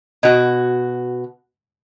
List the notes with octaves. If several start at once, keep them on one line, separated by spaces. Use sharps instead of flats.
B2 F#4 D#5